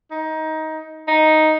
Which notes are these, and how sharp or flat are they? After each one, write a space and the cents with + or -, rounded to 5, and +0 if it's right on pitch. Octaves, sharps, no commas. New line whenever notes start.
D#4 +20
D#4 +5